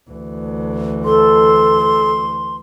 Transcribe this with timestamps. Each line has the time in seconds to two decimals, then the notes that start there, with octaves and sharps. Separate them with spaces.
0.10 D2 E3
1.05 A4 C6